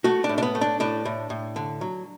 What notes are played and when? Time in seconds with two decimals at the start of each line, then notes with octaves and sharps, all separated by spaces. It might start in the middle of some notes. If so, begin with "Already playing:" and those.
0.04 A3 F#4
0.24 D4
0.29 A2
0.38 D4
0.43 B3
0.55 A3
0.61 D4
0.80 A2 D4
1.05 A2
1.30 A2
1.56 D3
1.81 F#3